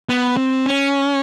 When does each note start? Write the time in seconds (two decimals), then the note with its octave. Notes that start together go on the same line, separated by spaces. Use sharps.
0.09 B3
0.37 C4
0.66 C#4